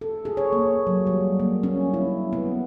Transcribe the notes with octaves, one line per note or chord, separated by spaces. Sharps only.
A4
G#4
C#5
A#3
F#3
G3
A#3
C#4
E4
B3